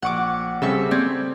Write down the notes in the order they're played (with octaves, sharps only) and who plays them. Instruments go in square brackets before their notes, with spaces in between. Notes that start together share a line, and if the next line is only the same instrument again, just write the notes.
[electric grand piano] A#1 C#6 [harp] F#5 D6
[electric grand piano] C#3 G3 C4 [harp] A4 E5 C#6
[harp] C4 [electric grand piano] D5 G6 G#6